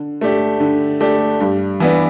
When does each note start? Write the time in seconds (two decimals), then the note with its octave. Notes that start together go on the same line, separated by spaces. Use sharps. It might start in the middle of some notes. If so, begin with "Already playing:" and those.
Already playing: D3
0.21 A3 D4 G4
0.60 D3
1.01 A3 D4 G4
1.40 G2
1.80 E3 B3 D4